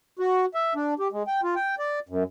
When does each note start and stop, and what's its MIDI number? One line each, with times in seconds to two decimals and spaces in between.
0.19 0.46 66
0.54 0.74 76
0.75 0.94 62
0.99 1.08 67
1.12 1.23 56
1.27 1.41 79
1.43 1.55 65
1.56 1.75 79
1.78 1.99 74
2.09 2.23 42